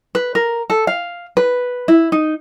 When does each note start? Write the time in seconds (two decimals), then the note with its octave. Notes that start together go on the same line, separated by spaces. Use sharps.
0.15 B4
0.35 A#4
0.70 A4
0.87 F5
1.37 B4
1.88 E4
2.12 D#4